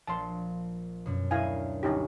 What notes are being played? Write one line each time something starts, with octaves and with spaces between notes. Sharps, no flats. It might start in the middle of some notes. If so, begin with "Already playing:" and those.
A#1 F3 A5 C6
F#2 B2
D2 E4 A#4 F5 G#5 A#6
G1 C#4 D#4 E4 G4